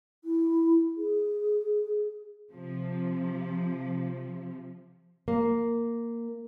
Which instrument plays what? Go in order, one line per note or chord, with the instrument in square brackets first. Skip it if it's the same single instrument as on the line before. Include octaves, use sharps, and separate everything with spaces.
[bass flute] E4
G#4
[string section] C3 F3
[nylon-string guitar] A#3